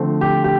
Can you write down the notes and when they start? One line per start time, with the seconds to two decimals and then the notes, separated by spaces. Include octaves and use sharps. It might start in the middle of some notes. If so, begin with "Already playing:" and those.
Already playing: D3 F3 A3 C4
0.21 G4
0.44 G4